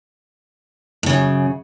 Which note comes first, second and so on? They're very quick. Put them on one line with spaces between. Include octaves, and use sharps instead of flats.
A2 C#3 F#2